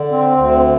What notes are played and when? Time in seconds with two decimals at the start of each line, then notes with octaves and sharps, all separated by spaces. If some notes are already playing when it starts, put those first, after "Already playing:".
Already playing: D3
0.11 C4
0.38 D2